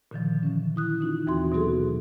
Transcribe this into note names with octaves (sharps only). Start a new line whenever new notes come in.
A#2 D3 D#3 F3
E3 C#4
E4 D#6 F#6
C#4 D#4 F4
D#2 E3 C4 F#4 C6
B2 F#3 B3 F#4 G#4 A4